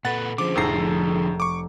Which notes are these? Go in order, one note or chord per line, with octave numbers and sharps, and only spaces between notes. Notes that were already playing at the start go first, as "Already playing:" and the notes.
A#2 A4 B4 F#5 A6
D3 F3 C#4 G#4 C5 D6
F1 A2 G#4 A4 A#5 C7
C#6 D6